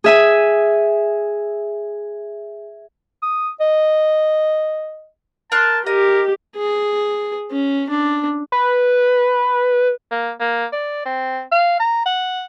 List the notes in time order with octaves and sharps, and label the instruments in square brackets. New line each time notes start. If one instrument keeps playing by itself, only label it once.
[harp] G#4 E5 G#5
[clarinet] D#6
D#5
[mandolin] A#4 C6 F#6 [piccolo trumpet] A5
[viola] G4 [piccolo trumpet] A#4 [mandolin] D#5
[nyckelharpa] G#4
C#4
D4
[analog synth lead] B4
[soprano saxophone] A#3
A#3
D5
C4
F5
A#5
F#5